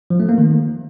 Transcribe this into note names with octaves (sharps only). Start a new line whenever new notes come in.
F3
A3
A#3
D#3